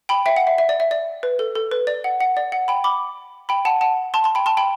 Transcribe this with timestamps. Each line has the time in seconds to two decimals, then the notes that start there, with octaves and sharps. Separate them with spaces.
0.09 G5 B5
0.26 E5 G5
0.36 F#5
0.47 E5
0.58 E5
0.69 D5
0.80 E5
0.91 D5
1.23 B4
1.39 A4
1.55 A4
1.71 B4
1.87 D5
2.04 F#5
2.21 F#5
2.37 D5
2.52 F#5
2.68 G5 B5
2.84 B5 D6
3.49 G5 B5
3.65 F#5 A5
3.81 F#5 A5
4.14 A5 C6
4.24 A5 C6
4.35 G5 B5
4.46 A5 C6
4.57 G5 B5